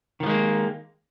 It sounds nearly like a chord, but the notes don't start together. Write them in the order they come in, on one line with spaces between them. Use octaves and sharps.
D#3 F3 G#3 A#3